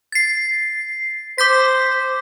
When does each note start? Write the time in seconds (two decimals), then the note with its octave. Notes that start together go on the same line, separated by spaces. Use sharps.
0.12 A6 C7
1.38 C5 D6 G6 B6